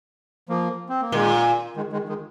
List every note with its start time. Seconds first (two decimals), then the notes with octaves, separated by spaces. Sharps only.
0.49 F3 A#3
0.89 C4
1.01 A#3
1.12 A#2 D#3 G#3
1.76 D#3 G#3
1.93 D#3 G#3
2.09 D#3 G#3